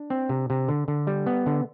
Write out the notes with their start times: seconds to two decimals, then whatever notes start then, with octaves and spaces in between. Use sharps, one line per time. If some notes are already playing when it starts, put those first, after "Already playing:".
Already playing: D4
0.10 C4
0.29 C3
0.50 C3
0.68 D3
0.88 D3
1.07 G3
1.26 B3
1.46 D3